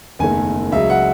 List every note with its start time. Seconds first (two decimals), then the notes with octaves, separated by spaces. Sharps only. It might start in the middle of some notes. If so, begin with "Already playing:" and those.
0.19 F#1 E2 D#3 A3 G#5
0.72 C#2 C#3 F#3 E5
0.90 F#5